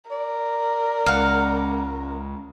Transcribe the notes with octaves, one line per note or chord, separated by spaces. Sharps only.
A#4 D5
C#2 F5 F#5